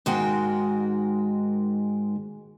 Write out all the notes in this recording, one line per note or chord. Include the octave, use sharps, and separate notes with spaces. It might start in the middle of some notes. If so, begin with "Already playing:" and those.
G#2 D#3 G#3 F#4 A#4 G5